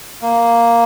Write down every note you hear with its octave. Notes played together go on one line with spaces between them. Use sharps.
A#3